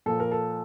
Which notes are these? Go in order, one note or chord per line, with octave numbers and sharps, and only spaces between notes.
A#2 F3 A4
A#4
A4